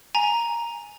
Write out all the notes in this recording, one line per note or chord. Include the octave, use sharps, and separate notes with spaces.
G#5 A#5